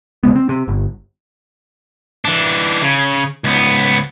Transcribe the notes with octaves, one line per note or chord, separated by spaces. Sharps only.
C3 D#3 G#3 B3
C4
C3
G1
E3 D4
C#3
C#2 B3